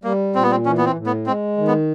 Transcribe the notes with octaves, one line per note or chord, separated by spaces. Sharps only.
G3 A#3
A#2 C4
B3
C4
E3 C#4
B3
C4
A2
B3
G#3 C4
D#3
B3